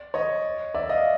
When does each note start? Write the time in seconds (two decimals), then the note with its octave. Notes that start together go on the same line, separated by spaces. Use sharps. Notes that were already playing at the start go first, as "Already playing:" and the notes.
Already playing: D5
0.14 C#5 D#5
0.74 D5 E5
0.89 D#5 F5